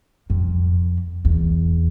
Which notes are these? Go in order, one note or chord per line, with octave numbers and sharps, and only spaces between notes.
F2
E2